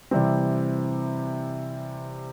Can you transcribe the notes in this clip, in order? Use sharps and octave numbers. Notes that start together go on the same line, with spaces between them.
C3 E3 G3 C4